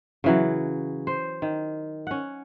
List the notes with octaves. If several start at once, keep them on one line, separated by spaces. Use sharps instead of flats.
C#3 E3 F#3
C5
D#3
C#4 F#5